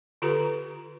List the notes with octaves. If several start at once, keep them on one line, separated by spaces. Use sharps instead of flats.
D3 F4 G4 A4 B4 A#5